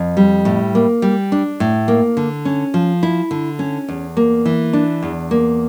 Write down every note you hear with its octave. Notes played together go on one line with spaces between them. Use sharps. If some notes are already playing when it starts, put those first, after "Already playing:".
Already playing: F2
G3
A2
A#3
G3
D4
A2
A#3
D3
C#4
F3
E4
D3
C#4
E2
A#3
E3
D4
E2
A#3